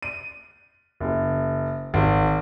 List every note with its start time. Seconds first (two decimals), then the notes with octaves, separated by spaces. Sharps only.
0.03 D#7
1.00 F#1
1.94 G#1